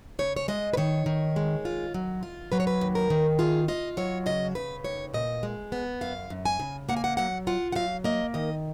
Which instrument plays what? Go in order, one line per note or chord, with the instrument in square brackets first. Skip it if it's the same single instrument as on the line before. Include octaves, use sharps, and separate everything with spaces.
[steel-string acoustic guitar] C#3 C#5
C#5
G#3 D#5
B4
D#3 C#5
D#3
G#3
F4
F#3
F4
F#3 B4
C#5
B4
D#2
A#4
D#3
F4 G#4
F4 D#5
F#3 C#5
C#3 D#5
C#3 B4
D#2 C#5
A#2 D#5
G#3
B3
F#2 F5
F#2
G#5
C#3
A#3 F#5
G#5
F#5
F#3 F#5
F4 F#5
F#5
F#3 F5
A#3 D#5
D#3 D#5